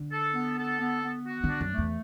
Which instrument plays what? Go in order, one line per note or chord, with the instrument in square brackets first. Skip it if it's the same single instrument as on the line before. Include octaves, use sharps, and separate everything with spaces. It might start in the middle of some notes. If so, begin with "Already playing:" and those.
Already playing: [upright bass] D3
[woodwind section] A4
B3
A4
B3
B3
F#4
[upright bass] D3 [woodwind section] D4
[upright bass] F#2
[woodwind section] A3
[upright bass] E2